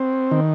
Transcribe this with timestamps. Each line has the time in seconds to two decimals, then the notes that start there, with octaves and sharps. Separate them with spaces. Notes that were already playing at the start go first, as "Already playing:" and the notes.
Already playing: C4
0.31 D#3